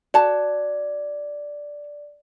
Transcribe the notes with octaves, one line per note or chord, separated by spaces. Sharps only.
F#4 D5 A5